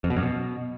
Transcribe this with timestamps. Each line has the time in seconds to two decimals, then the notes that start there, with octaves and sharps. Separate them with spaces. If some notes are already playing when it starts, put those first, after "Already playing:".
0.04 F2
0.10 B2
0.16 F#2
0.23 B2